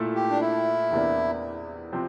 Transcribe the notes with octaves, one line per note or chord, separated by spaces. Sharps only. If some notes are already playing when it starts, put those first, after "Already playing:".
Already playing: A#2 A3 E4 A4
G4
D4
E4
E2 C3 E3 A#3 D4
C3 F3 C4